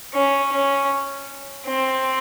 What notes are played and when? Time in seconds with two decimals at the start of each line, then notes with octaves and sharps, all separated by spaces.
0.13 C#4
0.52 C#4
1.67 C4